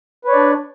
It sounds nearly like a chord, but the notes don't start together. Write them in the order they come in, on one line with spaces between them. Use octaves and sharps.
B4 C#5 D5 D4